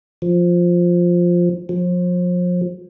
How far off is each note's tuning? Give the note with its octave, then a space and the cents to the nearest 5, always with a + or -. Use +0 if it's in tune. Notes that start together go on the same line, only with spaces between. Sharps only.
F3 +5
F3 +35